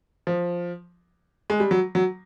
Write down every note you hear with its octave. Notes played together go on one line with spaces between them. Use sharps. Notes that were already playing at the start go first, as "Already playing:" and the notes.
F3
G#3
G3
F#3
F#3